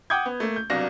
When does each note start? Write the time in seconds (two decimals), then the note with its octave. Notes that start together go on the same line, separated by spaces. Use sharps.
0.10 F#5 G5 D6 D#6 G6 G#6
0.26 B3
0.40 A3 A#3
0.56 G6
0.70 C2 B2 F#3 D4 F5 A#6